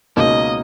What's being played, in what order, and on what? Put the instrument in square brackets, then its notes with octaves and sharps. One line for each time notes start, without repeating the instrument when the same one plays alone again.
[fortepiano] C#2 B2 A#3 D#4 [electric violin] D#5